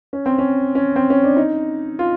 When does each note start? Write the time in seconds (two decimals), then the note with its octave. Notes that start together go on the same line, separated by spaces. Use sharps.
0.13 C#4
0.26 C4
0.38 C#4
0.75 C#4
0.96 C4
1.10 C#4
1.24 D4
1.37 D#4
1.99 F4